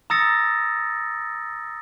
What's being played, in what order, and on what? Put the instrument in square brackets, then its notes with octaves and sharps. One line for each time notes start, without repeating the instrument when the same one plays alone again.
[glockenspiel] A#5 D#6 E6 A6 A#6 C#7